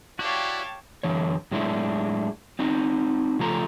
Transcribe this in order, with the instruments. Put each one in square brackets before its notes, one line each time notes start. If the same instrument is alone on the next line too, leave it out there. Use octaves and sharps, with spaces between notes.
[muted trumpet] E4 [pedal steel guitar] F#4 D5 [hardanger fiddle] G4 F5 [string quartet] C#5 G5 A5
[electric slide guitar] F#2 D3 E3 C#5
A2 F#3 G#3 D4 E4
C4 D#4 F#4
C#3 F3 A3 A#5